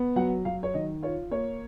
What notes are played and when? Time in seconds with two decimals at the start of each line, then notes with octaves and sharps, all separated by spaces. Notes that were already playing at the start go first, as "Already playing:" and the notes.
Already playing: B3
0.16 F#3 F#5
0.45 F#3 F5
0.63 C#5
0.74 D#3 D#5
1.03 F4 C#5
1.31 A#3 C#5